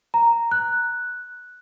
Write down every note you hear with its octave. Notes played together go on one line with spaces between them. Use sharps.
A#5
F#6